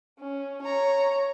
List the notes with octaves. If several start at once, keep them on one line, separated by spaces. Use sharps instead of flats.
C#4
C#5 A#5